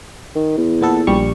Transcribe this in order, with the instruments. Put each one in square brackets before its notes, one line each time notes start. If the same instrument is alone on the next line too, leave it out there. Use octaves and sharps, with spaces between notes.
[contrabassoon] D#3
E2
[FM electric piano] A#2 B3 A4
A#1 G3 C#6